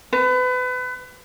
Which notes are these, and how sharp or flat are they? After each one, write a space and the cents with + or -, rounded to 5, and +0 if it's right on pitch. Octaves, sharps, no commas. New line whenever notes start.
B4 +30